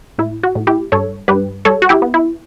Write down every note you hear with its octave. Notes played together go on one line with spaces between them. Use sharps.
A2 E4
F#4
A2
E4 G4
G2 A4 C#5
G2 G4 B4
G3 A4 C#5
F#4
E4 G4
B3
E4